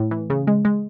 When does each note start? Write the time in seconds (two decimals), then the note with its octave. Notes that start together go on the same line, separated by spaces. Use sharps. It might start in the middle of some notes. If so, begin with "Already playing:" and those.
Already playing: A2
0.11 E3
0.30 C#3
0.47 G#3
0.65 G#3